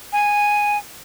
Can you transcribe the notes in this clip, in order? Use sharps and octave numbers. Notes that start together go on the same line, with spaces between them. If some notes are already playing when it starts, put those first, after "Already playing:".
G#5